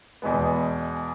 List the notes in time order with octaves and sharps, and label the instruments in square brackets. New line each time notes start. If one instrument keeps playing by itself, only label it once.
[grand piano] E2 B2 G#3 B3